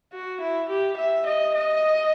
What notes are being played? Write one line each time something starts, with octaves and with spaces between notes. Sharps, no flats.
F#4
E4
G4
E5
D#5
D#5